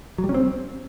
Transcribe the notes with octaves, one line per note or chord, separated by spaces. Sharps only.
F#3
G3
C#4
C4